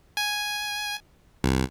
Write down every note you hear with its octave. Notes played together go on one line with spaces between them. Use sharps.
G#5
C2